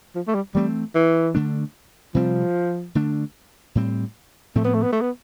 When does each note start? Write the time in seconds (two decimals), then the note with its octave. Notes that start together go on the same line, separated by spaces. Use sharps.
0.15 F3
0.27 A3
0.34 G3
0.55 E3 G3 A3 C4
0.95 E3
1.35 D3 A3 D4
2.15 C3 F3 G3 C4
2.95 D3 A3 D4
3.75 A2 G3 C4
4.55 A2 F3 A3 C4
4.65 B3
4.74 A3
4.82 B3
4.92 A3
5.01 B3